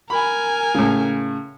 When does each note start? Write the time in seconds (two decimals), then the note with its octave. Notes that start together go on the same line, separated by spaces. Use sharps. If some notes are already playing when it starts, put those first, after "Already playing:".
0.10 A#4 G#5 B5
0.75 A2 C#3